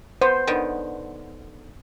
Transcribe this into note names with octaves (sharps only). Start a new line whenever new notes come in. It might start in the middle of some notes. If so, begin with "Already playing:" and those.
B3 C5
D3 D#3 B3